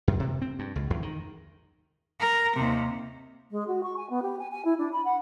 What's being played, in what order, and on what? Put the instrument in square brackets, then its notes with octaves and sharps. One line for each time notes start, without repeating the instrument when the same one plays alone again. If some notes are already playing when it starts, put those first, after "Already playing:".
[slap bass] F#2
C3
C4
G2
C#2
E2
D#3
[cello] A#4
D#2 C3
[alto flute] G#3
F#4
C#6
G#5
B3
G4
G#5
G#5
E4
D4
B5
F#5